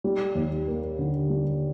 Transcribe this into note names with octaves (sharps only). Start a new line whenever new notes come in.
G3
D#2
A#3
D3
G3